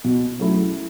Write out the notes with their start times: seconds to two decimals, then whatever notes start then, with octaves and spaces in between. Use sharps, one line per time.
0.04 B2
0.39 F#3 A3 C#4 E4